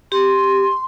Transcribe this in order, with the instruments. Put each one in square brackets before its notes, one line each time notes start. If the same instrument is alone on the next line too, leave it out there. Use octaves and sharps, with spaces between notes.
[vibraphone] G4 [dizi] C6